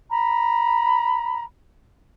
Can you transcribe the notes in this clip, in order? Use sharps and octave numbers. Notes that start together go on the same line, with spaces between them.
A#5 B5